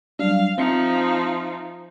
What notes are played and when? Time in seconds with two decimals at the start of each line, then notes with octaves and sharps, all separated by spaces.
0.19 F#3 G3 D4 F5
0.58 F3 C4 D#4 E5 C#7